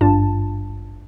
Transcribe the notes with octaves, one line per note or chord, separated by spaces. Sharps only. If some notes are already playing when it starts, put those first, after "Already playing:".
G#1 G2 D4 F4 A5